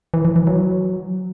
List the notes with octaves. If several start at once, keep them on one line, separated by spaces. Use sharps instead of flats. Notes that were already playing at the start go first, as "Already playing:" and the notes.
E3
E3
E3
F#3